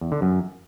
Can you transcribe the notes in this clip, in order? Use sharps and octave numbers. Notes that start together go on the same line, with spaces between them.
E2
D3
F#2